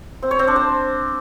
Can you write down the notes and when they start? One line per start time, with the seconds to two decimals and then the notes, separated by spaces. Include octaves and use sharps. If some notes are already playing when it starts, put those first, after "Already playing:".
0.22 C4
0.31 C#5
0.39 C4
0.48 D4
0.56 C5